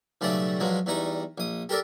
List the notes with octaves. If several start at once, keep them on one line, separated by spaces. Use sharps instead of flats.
B1 C#3 G3 A3 D5 A5
G2 F3 F#3 G#3
E2 G3 D#4 C#6
A#1 D#6
G4 A4 A#4 D5 E5